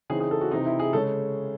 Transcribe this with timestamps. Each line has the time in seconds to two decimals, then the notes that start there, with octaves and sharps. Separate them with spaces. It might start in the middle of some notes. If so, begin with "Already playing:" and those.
0.10 C#3 E3 C4 D#4 G#4
0.20 G#4
0.31 A4
0.41 F#4
0.51 C3 E3 C4 D#4
0.66 E4
0.79 G#4
0.93 C#3 G#3 C#4 A4